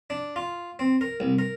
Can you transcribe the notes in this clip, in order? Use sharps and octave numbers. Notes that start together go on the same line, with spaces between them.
D4
F4
C4
A#4
C2
A#4